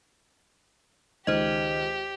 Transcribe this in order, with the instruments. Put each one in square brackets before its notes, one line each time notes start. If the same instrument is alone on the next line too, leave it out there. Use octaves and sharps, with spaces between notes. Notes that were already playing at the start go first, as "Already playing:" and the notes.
[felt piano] C#2 D#3 [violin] G4 [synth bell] C5 D#5